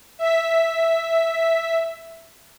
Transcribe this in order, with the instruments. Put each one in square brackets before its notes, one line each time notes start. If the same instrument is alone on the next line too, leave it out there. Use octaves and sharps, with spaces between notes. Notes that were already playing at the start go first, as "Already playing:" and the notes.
[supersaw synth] E5 B6